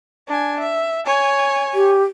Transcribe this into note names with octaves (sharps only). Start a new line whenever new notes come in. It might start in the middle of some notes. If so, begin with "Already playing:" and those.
D4 G#5
E5
C#5 G#5
G4